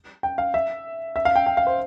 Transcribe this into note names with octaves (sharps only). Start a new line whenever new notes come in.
G5
F5
E5
E5
F5
G5
G5
F5
C5